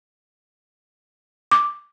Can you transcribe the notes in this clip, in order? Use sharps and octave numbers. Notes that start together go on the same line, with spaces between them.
D6